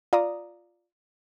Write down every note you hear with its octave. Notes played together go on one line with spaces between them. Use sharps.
F4 D5 A#5 D#6